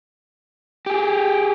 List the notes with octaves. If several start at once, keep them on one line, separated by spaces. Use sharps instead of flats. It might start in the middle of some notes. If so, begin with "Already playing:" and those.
G4 G#4